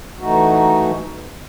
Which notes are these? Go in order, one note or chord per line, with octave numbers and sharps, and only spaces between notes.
E3 A3 D#4 F#4